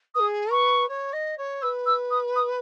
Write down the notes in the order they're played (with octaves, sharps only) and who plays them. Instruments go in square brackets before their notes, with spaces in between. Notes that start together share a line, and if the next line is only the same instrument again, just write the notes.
[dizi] B4 [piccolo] D#6
[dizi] G#4
[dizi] B4 [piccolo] C#6
[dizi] C#5
D#5
C#5
[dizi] B4 [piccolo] E6
[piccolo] E6
D#6
D#6